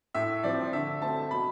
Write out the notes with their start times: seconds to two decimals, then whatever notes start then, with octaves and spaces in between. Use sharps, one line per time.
0.14 A2 E5
0.43 F3 C4 D5
0.73 D3 E5
1.02 A3 C4 A5
1.31 B2 B5